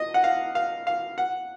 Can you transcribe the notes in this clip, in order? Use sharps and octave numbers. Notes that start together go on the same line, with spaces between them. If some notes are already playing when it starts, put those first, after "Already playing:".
Already playing: D#5
F#5
F5
F5
F5
F#5